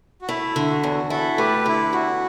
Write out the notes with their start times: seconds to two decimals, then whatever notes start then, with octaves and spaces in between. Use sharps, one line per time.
0.22 F#4
0.29 A3 E4
0.56 D3
0.70 F#4
0.83 E2
1.10 E4 F#4 A4
1.38 A3 G4 B4
1.66 D3 E4
1.93 E2 F#4